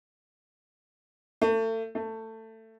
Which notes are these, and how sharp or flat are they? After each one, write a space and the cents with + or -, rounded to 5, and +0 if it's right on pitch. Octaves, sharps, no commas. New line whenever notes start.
A3 +35
A3 +20